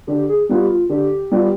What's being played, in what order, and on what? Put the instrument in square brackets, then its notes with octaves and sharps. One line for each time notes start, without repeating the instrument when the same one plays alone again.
[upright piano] D3 [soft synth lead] G4
[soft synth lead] G#4
[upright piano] G3 B3 F4 [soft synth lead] G4
[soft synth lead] F4
[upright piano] D3 [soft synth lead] G4
[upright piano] G3 B3 F4